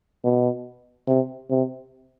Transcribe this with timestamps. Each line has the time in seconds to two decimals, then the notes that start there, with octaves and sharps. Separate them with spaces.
0.25 B2
1.08 C3
1.50 C3